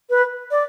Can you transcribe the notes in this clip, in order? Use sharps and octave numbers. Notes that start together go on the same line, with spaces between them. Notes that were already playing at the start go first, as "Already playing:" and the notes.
B4
D5